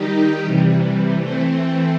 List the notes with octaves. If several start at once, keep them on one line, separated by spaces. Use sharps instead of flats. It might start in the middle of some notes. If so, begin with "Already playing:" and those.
Already playing: D#3 G3 D#4 G4
C3 E3 G3
E3 A3 C4